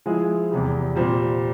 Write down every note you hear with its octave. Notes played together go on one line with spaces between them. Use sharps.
F3 G#3 E4 G#4
E2 C3 G3
A#2 G3 C4